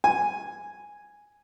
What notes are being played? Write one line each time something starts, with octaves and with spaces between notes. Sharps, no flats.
G#5